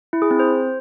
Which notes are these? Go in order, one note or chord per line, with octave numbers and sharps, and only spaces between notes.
E4
G#4
C4
C5